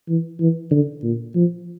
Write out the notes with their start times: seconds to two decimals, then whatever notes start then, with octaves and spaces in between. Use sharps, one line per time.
0.09 E3
0.40 E3
0.71 D3
1.03 A#2
1.35 F3